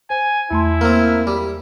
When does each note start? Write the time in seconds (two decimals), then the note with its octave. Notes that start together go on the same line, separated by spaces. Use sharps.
0.10 C5 G#5
0.51 E2 A3 E4 C6
0.81 A#3 C4
1.27 G3 D6